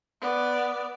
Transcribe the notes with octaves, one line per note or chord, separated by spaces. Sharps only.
B3 D5